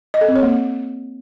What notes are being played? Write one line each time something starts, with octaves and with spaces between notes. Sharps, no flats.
D#5
A4
C4
C#5
A#3